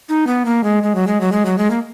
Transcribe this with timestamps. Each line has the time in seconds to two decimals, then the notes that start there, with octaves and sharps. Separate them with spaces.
0.09 D#4
0.27 B3
0.45 A#3
0.64 G#3
0.83 G#3
0.95 F#3
1.07 G#3
1.21 F#3
1.32 G#3
1.46 F#3
1.58 G#3
1.70 A#3